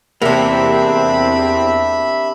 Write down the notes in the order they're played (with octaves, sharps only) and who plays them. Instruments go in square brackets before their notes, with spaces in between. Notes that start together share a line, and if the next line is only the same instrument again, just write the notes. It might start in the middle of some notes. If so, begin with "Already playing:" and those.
[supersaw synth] E2 C4 [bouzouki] C3 D4 [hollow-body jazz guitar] A#3 [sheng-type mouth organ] E5 B5